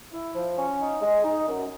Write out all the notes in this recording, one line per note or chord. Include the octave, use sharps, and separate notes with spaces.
E4
F3
C#4
D#4
G#3
D#4
F#2